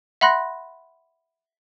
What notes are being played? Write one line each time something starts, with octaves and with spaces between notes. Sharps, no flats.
E5 F#5 B5 C6 F#6 A#6